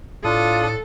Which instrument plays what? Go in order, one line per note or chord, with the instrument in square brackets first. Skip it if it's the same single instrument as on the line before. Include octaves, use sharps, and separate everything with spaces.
[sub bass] A2 [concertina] D4 D#6 [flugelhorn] F4 [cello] A4